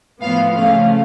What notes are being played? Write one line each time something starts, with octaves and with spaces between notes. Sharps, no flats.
A2 F3 B3 F5
C#3 F3 A3 C#4 F5